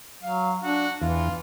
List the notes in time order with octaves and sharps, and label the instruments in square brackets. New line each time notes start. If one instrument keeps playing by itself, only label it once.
[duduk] F#3 [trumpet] F5
[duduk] D4 [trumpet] F#4
[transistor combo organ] E2 [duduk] E3 [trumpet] F4